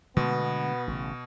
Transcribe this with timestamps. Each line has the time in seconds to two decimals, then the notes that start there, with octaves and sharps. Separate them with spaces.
0.17 B2 D3 G#3 A3 B3
0.88 A1 C#3